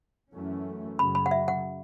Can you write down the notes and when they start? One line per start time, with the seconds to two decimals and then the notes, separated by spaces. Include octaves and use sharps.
0.34 F#2 E3 A3 C#4
0.99 F#2 C#3 F#3 B5
1.15 B5
1.26 F#5
1.31 E5
1.48 F#5